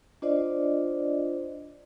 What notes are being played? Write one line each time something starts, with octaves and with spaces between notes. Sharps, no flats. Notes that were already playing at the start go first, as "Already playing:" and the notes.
D4 F4 C5 D5 D#5